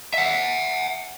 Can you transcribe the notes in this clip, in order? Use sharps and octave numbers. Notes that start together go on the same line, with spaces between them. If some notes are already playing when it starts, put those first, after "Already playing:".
E5 F#5